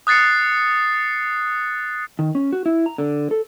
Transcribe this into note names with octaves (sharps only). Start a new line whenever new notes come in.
D#6 F#6 A6 C7 C#7
D#3
C#4
F#4
E4
A#5
D3
A4